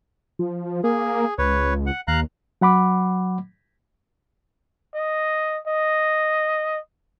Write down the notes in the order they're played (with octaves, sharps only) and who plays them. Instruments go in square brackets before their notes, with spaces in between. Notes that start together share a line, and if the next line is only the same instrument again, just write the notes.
[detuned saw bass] F3
[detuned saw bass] A#3 [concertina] G#4
[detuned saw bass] C#2 [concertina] B4 C#5
[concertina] F#5
[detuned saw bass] D#2 [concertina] F5 A#5 F#6
[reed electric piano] F#3 F#5 B5 D6
[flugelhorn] D#5
D#5